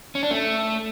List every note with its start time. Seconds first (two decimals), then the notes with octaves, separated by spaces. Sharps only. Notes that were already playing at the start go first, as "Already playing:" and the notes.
0.15 C#4
0.23 D4
0.31 A3